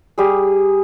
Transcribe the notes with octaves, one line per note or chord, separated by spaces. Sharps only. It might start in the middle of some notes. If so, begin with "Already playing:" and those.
G3 G#4